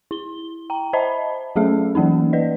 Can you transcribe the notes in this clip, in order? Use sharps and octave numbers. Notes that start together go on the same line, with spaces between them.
E4 G7
G5 A#5
C5 D#5 E5 A5 B5
F#3 A3 C#4 G#4 A4 E5
E3 F#3 A#3 C#4 D#4
B4 D5 D#5